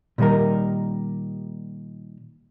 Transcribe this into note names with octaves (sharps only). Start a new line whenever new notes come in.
A#2 D#3 G3 D#4 A#4